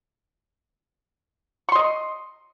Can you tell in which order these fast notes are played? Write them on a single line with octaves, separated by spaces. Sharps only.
C#6 C6 D#5